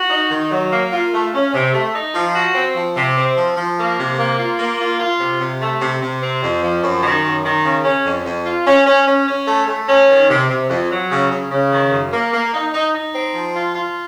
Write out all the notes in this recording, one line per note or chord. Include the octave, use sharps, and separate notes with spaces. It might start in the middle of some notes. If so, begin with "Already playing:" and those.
Already playing: F#4
D#4
D#3
F#3
A#3
F4
A3
C#4
C3
A3
D#4
F3
F#4
C4
F3
C3
C4
F3
F3
A#3
C3
A#3
F4
A#3
F4
F4
C3
C3
A3
C3
C3
C4
F2
F3
F#2
D#3
F#2
D#3
C#3
C#4
F2
F2
F4
C#4
C#4
C#4
C#4
A3
A3
C#4
D#3
C3
C3
F2
F#3
C#3
C#3
C#3
D#3
F#2
A#3
A#3
D#4
D#4
D#4
C4
F3
F4
F4